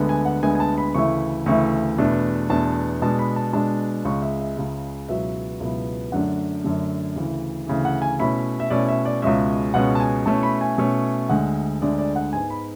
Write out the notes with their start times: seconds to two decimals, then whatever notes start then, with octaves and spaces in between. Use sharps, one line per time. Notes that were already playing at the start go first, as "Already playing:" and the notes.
Already playing: D2 D3 G#3 B3
0.09 G#5
0.25 F#5
0.43 D2 D3 G#3 B3 G#5
0.55 G#5
0.60 A5
0.78 B5
0.94 D2 C#3 E3 A3 E4 C#6
1.46 D2 C#3 E3 A3 E4 C#6
1.98 E2 B2 A3 D4
2.50 E2 B2 A3 D4 A5
3.02 B2 G#3 D4 A5
3.19 B5
3.36 A5
3.53 B2 G#3 D4 A5
4.05 C#2 C#3 G#3 C#6
4.22 E5
4.40 E5
4.57 C#2 C#3 G#3
5.09 C#2 B2 F#3 B3 E4 E5
5.60 C#2 B2 F#3 B3 E4
6.12 F#2 D3 A3 D4 F#5
6.64 F#2 D3 A3 D4
7.16 D2 C#3 E3
7.67 D2 C#3 E3
7.85 F#5
8.02 G#5
8.19 B2 A3 C#4 E4 B5
8.60 E5
8.70 B2 A3 C#4 E4 D5
8.89 E5
9.05 D5
9.22 C#2 B2 G#3 C#4 E5
9.74 C#2 B2 G#3 C#4 F#5
9.95 A5
10.00 G#5
10.26 B2 A3 C#4 E4 A5
10.43 B5
10.61 G#5
10.78 B2 A3 C#4 E4
11.29 D2 D3 G#3 F#5
11.82 D2 D3 G#3 D5
11.99 D5
12.16 F#5
12.33 G#2 G#3 B3 G#5
12.50 B5